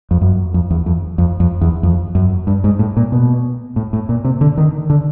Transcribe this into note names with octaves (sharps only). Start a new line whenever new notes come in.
F2
F#2
F2
E2
F2
F2
F2
E2
F2
F#2
G2
G#2
A2
A#2
B2
A2
A2
A#2
C3
D3
D#3
D3